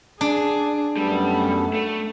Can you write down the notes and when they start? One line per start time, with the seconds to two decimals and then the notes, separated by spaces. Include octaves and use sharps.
0.21 D4 G#4
0.97 F#2 G3 A3 B3 A4
1.74 A3